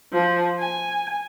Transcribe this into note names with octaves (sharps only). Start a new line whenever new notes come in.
F3
G#5